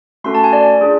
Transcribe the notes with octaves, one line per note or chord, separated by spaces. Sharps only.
A3 C#4 F#4 A4 C6
A5
G#5
D5
D4 F4 G#4